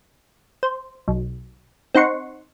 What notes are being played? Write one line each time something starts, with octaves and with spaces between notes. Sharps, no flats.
C5
B1
C4 D#4 F#5 C6 C#6